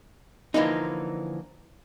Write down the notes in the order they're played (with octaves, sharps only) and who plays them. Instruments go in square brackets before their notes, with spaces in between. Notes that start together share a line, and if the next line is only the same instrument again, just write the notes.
[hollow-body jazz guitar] D3 E3 F3 A#3 D4 D#4